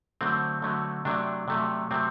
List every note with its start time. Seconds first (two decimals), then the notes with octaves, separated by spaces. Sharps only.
0.21 D3 F#3 A3 C4
0.62 D3 F#3 A3
1.05 C3 F#3 A3 D4
1.48 C3 F#3 A3
1.91 C3 F#3 A3 C4